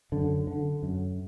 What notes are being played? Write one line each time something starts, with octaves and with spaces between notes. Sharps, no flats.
F#2 D3
D3
F#2